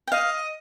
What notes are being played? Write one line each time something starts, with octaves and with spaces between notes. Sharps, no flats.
G5
D#5 F5